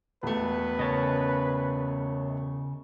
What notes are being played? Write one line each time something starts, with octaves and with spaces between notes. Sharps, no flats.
E1 A3 B4
C#3 A#4 C#5 D#5 A5